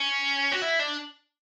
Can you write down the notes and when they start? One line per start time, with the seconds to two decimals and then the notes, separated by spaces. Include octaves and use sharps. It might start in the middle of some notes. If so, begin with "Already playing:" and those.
Already playing: C#4
0.52 F#4
0.62 E4
0.79 D4